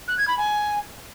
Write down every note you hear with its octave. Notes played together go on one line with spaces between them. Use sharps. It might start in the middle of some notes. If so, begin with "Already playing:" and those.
F#6
G#6
B5
G#5